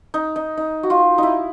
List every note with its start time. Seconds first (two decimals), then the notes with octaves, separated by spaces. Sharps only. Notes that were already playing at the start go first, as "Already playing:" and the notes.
0.14 D#4
0.36 D#4
0.57 D#4
0.83 F#4
0.90 F4
1.18 D#4 E4